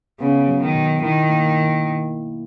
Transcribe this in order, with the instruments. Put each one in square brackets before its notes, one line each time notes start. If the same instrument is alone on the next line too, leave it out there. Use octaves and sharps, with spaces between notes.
[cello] C#3 [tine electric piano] B3
[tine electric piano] F#3
[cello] D#3
[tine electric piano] B2
[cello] D#3 [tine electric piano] E4
[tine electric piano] A#3